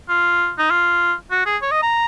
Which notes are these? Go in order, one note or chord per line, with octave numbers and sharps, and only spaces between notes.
F4
D#4
F4
F#4
G#4
C#5
D#5
A#5